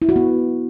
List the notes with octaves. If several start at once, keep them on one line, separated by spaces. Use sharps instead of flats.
E4
F#4
B3